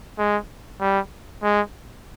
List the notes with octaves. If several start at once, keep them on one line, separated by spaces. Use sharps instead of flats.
G#3
G3
G#3